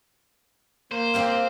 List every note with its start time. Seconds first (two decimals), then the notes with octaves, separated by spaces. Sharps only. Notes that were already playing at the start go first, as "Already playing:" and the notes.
0.91 A#3 C5
1.14 C4 G4 F5